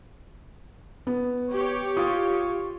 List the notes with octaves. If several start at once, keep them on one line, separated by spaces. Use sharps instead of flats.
B3
G4 C#5
F4 D#6